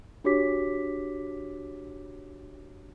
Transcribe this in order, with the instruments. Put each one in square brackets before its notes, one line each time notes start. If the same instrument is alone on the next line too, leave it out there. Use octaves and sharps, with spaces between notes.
[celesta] D4 F#4 G4 C#5 D6 B6